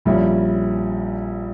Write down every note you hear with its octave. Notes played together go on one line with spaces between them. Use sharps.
A#1 A#2 G3 C#4 E4